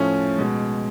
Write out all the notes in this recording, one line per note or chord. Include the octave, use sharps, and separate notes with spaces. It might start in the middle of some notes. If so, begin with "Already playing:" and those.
Already playing: A2 F3 A3 C#4
B2 G#3